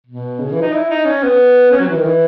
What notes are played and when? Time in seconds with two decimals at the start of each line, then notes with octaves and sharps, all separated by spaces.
0.06 B2
0.39 C#3
0.51 E3
0.61 D#4
0.73 E4
0.90 D#4
1.05 C#4
1.23 B3
1.71 C#4
1.80 F#3
1.89 E3
1.97 D#3
2.05 E3